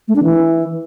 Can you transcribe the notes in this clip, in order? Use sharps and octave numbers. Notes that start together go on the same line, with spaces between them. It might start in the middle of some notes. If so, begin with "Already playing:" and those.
A3
D4
E3